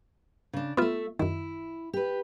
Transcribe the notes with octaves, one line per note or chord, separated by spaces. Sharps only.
C#3 D4
A3 B3 F4 E5
F#2 D#3 E4
G4 B4